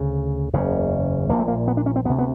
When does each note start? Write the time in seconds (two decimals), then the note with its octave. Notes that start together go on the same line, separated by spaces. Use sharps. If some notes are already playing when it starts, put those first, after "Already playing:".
Already playing: D2 C#3
0.53 F#1 E2 C#3
1.29 A#1 A#2 A#3
1.39 A3
1.48 A#3
1.68 B3
1.77 D4
1.86 C#4
1.96 C4
2.05 D2 B3
2.09 C3
2.19 B3